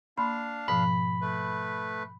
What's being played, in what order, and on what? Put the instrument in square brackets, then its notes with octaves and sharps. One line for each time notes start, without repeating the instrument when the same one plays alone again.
[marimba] A#3 B5 C6 [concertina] D4 F5
[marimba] G#2 B2 F3 [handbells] B5 B6
[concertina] A3 B4